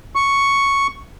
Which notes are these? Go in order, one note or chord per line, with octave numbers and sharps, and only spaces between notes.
C#6